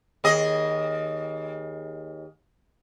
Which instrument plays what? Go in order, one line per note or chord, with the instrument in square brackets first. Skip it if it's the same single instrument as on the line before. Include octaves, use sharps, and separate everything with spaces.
[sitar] D#2 G#4 D#5